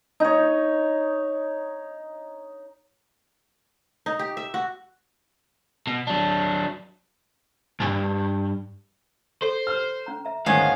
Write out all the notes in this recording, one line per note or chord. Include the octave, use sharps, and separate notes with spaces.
D#4 C#5
D#4
G4
E5
F#4
B2
F#3 D4
B1 G2
A4 C5
F6
C#4 A#5
E5 A#5
D2 G#2 D#3 B3 C#4 F5